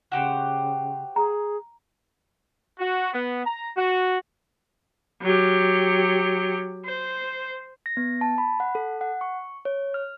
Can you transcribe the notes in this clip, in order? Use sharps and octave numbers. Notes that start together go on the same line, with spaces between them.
C#3 F#4 G4 C5
G#4 A#5
F#4
B3
A#5
F#4
F#3 G4
C5
A#6
B3
A5
B5
F#5
A4
F#5
C#6
C#5
F6